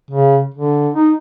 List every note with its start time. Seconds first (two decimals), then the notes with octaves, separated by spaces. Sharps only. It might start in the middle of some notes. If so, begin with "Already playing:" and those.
0.11 C#3
0.54 D3
0.94 D#4